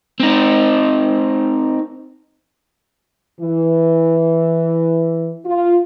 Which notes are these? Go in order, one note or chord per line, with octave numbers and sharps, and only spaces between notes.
C4 D#4
E3
F4